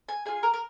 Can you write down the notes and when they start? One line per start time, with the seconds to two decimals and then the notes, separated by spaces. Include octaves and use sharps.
0.09 G#5
0.26 F4 G#4 G#5
0.43 A#4
0.54 A#4